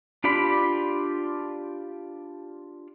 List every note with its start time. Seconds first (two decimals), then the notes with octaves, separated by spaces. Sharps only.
0.24 D4 F4 G4 D5 B5